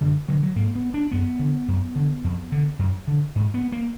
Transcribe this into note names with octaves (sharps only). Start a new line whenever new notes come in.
F#2 D3
D3 F#3
F#3
G#2 A#3
B3
D4
F#2 B3
D3
F#2
D3
F2
D3
F#2
D3
G#2
B3
A#3